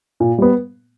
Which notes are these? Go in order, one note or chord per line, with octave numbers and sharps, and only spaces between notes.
A#2
G3 B3